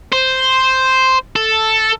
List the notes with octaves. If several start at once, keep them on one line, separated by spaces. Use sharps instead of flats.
C5
A4